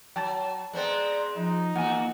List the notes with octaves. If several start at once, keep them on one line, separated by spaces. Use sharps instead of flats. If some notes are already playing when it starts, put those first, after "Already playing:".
F#3 G5 A5 A6
G#3 B3 C4 D5 A#5
F3 D#4
E2 A#3 F#4 F#5 G#5